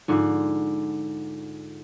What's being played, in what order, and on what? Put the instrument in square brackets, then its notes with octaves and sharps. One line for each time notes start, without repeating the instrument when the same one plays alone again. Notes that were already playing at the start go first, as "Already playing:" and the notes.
[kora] G#2 D3 F3